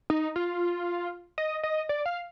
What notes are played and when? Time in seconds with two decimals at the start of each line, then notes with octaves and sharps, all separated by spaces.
0.10 D#4
0.36 F4
1.38 D#5
1.63 D#5
1.89 D5
2.06 F5